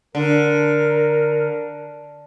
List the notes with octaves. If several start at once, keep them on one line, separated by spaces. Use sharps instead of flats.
D3 A#4